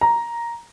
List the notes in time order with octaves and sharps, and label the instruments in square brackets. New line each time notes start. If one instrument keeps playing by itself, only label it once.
[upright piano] A#5